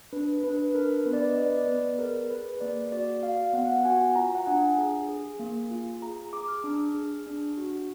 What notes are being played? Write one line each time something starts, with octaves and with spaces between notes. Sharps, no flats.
D4 B4
D4 B4
D4 A#4
B3 B4
D5
B4
D#5
B3 D5
D5
B3 B4
G#4 A#4
G#4 B4
A#3 D5
F#4 D5
F#4 F5
B3 F#5
F#5
F#4 G#5
F4 A#5
F#5
D4 G#5
G#4
G#4
A#3
F4
G#4 A#5
G#4 D6
F6
D4
G#4
D4
F#4